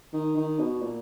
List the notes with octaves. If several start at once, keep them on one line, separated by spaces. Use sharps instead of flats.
D#3
D#3
B2
A#2